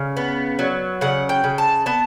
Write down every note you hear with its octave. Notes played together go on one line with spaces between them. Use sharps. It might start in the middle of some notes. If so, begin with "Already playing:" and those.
Already playing: C#3
B3
F#3
C#3 F#5
G5
C#3
A5
B3 A5